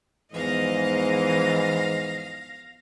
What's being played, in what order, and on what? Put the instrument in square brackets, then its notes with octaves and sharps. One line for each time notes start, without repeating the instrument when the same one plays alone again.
[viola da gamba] E2 F3 D#5 [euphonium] G#2 [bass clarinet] E3 [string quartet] F5 A#6